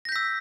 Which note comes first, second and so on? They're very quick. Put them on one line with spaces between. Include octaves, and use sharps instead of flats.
A#6 G6 B6 E6